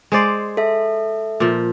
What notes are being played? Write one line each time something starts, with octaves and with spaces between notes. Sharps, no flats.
G#3 C5 D5
A4 E5
A#2 F3